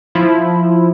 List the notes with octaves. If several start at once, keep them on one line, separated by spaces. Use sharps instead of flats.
F3 E4